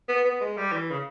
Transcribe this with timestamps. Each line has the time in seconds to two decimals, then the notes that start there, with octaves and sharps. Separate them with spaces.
0.09 B3
0.24 B3
0.41 G#3
0.57 G3
0.72 E3
0.90 C#3